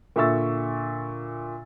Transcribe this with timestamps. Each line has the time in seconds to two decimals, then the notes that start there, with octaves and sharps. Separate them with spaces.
0.16 A#2 D3 E5 C#6 E6 A6